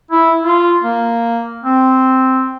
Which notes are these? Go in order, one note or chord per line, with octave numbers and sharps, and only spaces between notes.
E4
F4
A#3
C4